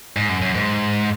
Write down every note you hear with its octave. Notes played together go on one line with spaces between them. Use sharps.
G#2
F#2
F#2
G#2